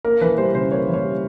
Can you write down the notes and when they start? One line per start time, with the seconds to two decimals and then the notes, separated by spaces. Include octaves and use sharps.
0.05 A#3 A#4
0.21 E3 B4
0.38 G3 C5
0.55 C#3 C5
0.71 A#3 C#5
0.88 E3
0.94 C#5
1.04 G3